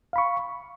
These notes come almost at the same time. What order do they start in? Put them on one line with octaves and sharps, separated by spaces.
F5 B5 C#6